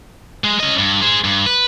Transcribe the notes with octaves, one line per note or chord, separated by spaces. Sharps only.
G#3
C#4 D#5
G2
G#4 C5
G2
B4